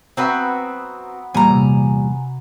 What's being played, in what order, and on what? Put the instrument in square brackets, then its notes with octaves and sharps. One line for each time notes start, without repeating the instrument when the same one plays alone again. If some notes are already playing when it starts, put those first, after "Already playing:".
[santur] F#3 B3 E5 [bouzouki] C4 F#4 B4
[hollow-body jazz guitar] E2 A#2 G3 [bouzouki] G#5 A#5
[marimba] C3